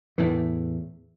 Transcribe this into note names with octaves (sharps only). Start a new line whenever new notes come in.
E2 A2 E3